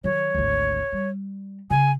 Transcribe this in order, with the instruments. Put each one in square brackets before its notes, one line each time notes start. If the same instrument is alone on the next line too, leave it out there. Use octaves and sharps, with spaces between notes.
[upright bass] D#3 F#3 [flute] C#5
[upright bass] G#1 D2
G3
[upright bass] C#3 [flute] G#5